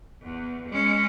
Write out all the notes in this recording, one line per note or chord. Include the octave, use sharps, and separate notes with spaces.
E2
G#3 C#4